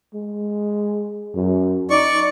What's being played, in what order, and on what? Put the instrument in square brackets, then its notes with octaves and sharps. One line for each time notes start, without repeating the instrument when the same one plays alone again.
[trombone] G#3
F#2
[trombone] D#4 [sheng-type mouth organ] D5 C#6